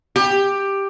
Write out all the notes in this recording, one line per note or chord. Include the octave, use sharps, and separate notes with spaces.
G4